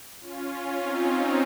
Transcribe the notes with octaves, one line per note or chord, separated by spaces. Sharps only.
C#4 F4
C#4 F4
C4 D#4